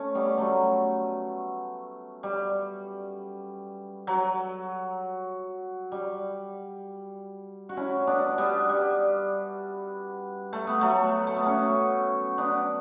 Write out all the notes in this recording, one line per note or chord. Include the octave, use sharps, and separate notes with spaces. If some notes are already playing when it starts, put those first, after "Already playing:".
Already playing: A3 C#4
G3 B3
F#3 A3
G3
F#3
G3
F#4
C#4 E4
B3 D4
G3 B3
G3
A3
B3
F#3 A3
A3
B3
A3 C#4
B3 D4